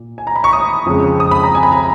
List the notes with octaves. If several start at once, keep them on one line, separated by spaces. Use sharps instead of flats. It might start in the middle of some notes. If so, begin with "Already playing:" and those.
Already playing: A#2
G#5
A#5
B5
C#6
D#6
F2 C#3 G#3
D#6
B5
A#5
G#5
B5
A#5